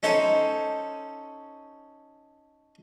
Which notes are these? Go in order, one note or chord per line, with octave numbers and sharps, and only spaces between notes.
C#4 D#4 A4 C5